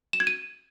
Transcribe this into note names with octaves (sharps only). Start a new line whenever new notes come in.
E7
G#6
D#7